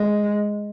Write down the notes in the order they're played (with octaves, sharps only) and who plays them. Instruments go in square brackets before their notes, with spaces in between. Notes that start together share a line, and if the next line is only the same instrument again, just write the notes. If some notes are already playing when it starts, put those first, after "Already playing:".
Already playing: [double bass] G#3